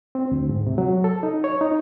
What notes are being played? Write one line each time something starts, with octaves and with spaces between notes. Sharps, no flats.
C4
D2
G#2
C3
F#3
A4
D#4
C#5
D#4